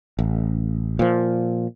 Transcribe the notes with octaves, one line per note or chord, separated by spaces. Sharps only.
A1
A#2 F3